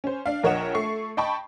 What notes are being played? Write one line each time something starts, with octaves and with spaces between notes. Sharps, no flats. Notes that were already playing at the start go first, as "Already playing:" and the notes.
C#4 C5
D4 F5
A#1 A#4 C#5 D#5 F#5 E7
A3 C#6 C7
D#5 G5 A5 B5 C#6